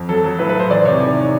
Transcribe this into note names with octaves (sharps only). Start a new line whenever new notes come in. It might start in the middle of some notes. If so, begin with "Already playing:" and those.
Already playing: F2
F#3 A4
F#3
A2 B4
B4
A2 C5
E2 D5
C3 C#5
D#3